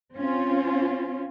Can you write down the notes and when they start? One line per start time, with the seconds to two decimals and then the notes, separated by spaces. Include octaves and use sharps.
0.17 C4 C#4 F4